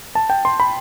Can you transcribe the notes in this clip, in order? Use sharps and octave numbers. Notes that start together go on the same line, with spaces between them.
A5
G5
C6
B5